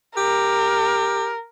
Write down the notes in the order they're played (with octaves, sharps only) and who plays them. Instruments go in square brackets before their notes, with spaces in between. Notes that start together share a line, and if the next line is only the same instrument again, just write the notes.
[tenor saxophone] G4 [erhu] A#4